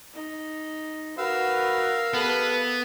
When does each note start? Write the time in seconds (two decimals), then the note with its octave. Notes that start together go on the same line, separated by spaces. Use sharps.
0.14 D#4
1.18 F#4 A#4 B4 F5 E6
2.14 B3 G4 A4 B4